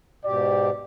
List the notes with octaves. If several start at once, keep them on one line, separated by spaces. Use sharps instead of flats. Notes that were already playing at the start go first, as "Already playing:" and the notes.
G#2 B2 G4 D5